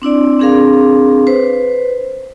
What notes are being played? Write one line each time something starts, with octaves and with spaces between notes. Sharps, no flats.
C4 D4 E4 D5
C4 D4 G#4 A#4 F5
B4 C5